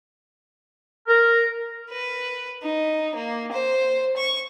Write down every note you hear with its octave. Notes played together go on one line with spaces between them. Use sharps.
A#4
B4
D#4
A#3
C5
C#6